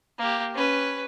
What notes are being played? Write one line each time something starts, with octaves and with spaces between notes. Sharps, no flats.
A#3 G4
C#4 B4